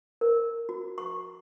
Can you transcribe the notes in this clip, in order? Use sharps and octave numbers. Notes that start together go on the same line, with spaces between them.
A#4
F#4
C#6